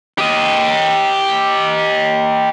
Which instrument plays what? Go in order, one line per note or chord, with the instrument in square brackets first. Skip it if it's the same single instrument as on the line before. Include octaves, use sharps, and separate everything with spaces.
[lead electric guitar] G4 D#5